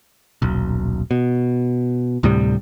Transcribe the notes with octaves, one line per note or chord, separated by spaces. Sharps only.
D#1 B1
B2
D2 A2 C3 G3